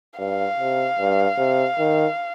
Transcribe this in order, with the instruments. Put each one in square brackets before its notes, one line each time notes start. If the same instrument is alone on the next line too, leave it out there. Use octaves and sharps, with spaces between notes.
[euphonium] G2 [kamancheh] F5
[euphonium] C3
G2
C3
D#3